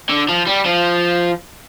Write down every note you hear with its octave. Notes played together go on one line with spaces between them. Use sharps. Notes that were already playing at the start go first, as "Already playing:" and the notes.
D3
F3
G3
F3